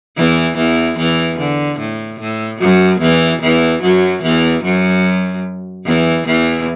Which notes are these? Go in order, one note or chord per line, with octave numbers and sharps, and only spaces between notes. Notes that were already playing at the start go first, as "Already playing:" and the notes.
E2 E3
E2 E3
E2 E3
D3
A2
A2
F#2 F#3
E2 E3
E2 E3
F#2 F#3
E2 E3
F#2 F#3
E2 E3
E2 E3